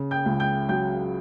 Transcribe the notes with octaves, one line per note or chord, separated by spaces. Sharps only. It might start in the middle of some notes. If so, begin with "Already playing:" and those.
Already playing: C#3
G5 G6
C#2
G5 G6
F#3 G5 G6